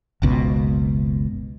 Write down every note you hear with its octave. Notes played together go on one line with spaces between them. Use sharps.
F#1 C#2 B2